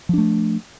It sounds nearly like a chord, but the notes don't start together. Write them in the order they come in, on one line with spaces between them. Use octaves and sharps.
F3 D4 A3